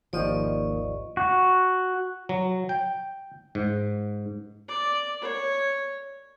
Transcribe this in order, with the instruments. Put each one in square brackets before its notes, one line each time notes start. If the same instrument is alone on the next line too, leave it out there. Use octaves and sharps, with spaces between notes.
[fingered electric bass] G#1 [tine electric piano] D#2 D#3 [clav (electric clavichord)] F3 [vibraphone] D5 D#5 C#6
[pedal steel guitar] F#4
[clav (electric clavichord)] F#3
G5
G#2
[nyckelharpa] D5
C#5